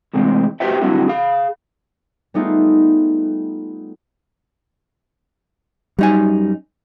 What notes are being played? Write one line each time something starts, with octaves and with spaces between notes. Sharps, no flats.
A2 C3 E3 G#3 C4
F#4 G4 B4 C5 E5 G5
D3 F#3 G3 C4 E4 F#4
G#4 F5
G3 A3 B3 D#4 F4 G#4
F#2 G3 D#4 G#5